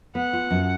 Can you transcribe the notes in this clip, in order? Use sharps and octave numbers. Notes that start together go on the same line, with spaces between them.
B3 F#5
F4
F#2